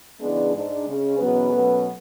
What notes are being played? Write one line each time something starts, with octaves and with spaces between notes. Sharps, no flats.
C#3 E3 G#3 B3 D4
G#2 G#3 D4
C#3 G#3 C#4
E2 B2 F#3 B3 C#4 B4
B2 F#3 A3 C#4